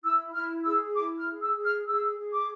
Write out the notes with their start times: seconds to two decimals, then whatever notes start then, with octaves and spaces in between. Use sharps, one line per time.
0.03 E4 E6
0.34 E4 F6
0.64 G#4 E6
0.95 E4 D6
1.18 F6
1.26 G#4
1.41 E6
1.56 G#4
1.64 F6
1.87 G#4 E6
2.18 G#4
2.33 D6